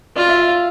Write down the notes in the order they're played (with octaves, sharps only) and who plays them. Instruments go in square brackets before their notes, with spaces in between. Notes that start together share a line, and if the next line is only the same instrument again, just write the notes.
[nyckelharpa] F4 [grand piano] D5
[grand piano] E5
F5